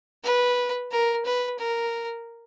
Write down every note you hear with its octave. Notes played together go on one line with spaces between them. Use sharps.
B4
A#4
B4
A#4